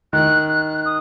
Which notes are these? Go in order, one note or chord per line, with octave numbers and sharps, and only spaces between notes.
D#3 F#6
F#6
F#6
D#6